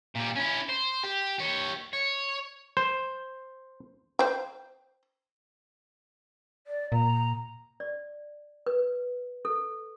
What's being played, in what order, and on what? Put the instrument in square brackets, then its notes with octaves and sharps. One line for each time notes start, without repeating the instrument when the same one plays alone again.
[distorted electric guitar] A#2 G3
C#4 E4
C5
G4
G4 C#5
C#5
[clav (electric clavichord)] C5
[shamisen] C5 G5
[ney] D5
[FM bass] A#2 [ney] A#5
[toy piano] D5
B4
A4